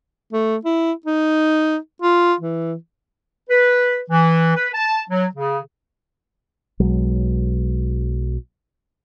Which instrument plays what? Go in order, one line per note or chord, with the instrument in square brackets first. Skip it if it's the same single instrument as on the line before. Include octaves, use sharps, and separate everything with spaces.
[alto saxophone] A3
E4
D#4
F4
E3
[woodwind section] B4
E3
B4
A5
F#3
C#3
[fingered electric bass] B1 F#3 G#3